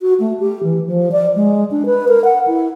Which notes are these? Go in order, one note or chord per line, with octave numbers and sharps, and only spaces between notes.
F#4
A3
G4
E3
F3
D5
G#3
D4
B4
A#4
F#5
E4